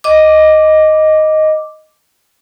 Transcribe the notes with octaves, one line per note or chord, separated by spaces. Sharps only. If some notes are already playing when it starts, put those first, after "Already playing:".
D#5 D6